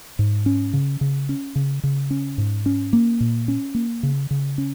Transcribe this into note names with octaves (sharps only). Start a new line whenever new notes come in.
G#2
C#4
C#3
C#3
C#4
C#3
C#3
C#4
G#2
C#4
A#3
A#2
C#4
A#3
C#3
C#3
C#4